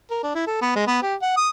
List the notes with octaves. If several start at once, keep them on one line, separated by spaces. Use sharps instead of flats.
A#4
D4
E4
A4
B3
G#3
B3
G4
F#5
D#6